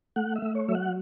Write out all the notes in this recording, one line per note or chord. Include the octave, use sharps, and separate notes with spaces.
A3 F#5
E5
A3
C#5
F#3 E5
F#5